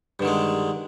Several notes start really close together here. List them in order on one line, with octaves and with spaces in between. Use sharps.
G2 D3 D#3 G#3